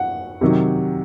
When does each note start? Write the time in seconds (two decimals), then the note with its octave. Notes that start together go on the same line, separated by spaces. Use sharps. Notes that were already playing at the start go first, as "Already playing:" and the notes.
Already playing: F#5
0.41 C3 D#3 F#3